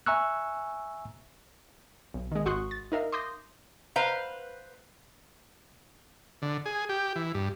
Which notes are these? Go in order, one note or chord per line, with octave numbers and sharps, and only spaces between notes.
E5 G#5 A#5 C#6 E6 F#6
B1
D#3 G#3
G#1 F#4 C6 C#6 D#6 F#6
A6
D#4 A#4 E5 F5
C6 D6 D#6 G6 A#6
B4 C5 F5 A#5
D3
G#4
G4
E3
G2